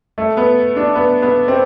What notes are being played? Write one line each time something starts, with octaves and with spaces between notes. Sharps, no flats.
A3
B3
D4
B3
B3
C4